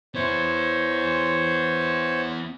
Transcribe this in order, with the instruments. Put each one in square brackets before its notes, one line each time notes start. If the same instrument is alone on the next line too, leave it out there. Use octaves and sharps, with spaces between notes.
[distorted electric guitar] B3 E4 [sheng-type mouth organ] C5 C#5